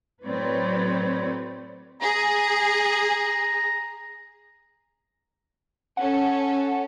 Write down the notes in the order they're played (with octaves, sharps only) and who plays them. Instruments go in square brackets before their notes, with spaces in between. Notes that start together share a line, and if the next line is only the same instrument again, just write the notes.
[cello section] A2 F#3 C4 B4 C#5 D5
[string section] G#4 [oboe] A#5
[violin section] C#4 A4 [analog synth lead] F#5